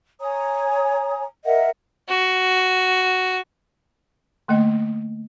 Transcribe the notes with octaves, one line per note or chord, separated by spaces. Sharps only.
C#5 G#5 A#5 D#6
A#4 D#5 E5 F#5
F#4
D3 A3 A#3 D#5